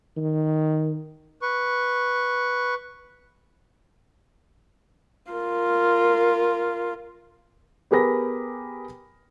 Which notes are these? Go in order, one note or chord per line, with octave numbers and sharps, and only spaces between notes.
D#3
B4 C#6
F4 A#4
B3 G4 G#4 A#4 B5 A#6